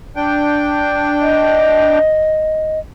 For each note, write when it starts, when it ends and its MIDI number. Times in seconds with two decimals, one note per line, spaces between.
0.16 1.99 62
0.16 1.99 79
1.21 2.79 75